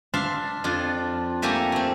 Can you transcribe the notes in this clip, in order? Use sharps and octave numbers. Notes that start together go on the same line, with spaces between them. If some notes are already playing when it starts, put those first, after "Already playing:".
D4 E5 F5 A5 C6
F2 D4 F4
A3 A#3 G4 A4 G#5 A#5
A3 C4